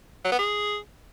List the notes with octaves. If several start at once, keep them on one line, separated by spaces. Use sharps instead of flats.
F#3
B3
G#4